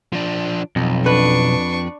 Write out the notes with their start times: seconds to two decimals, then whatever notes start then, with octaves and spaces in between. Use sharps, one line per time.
0.13 F3 D4
0.76 B1 F2
1.06 D4 B4 C#6